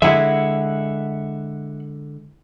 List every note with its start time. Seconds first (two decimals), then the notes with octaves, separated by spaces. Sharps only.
0.02 D3 G#3 E4 G#4 E5 F#5